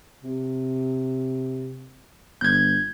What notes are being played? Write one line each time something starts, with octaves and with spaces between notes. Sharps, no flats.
C3
G1 G6 G#6